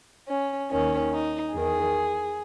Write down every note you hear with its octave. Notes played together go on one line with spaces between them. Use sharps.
C#4
D#2 D#3 C#4
D#4
E2 D#3 G#4